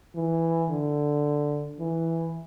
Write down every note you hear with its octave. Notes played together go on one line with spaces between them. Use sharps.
E3
D3
E3